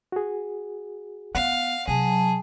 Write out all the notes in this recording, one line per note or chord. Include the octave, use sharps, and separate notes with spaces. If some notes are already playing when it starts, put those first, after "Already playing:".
F#4 G#4
B3 F5 F#5
C3 F#3 G#4 A5